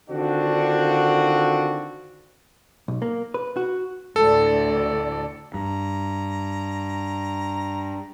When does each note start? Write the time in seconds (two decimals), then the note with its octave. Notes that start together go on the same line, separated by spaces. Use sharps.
0.10 D3 D#3 C4 D4 F4 F#4
2.88 B1
3.02 A#3
3.34 B4
3.57 F#4
4.16 D2 A2 A4 D5
5.54 G2 A#5